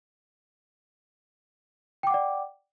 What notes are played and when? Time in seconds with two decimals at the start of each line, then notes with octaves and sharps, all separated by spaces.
2.03 G5
2.07 D6
2.10 F#5
2.14 D5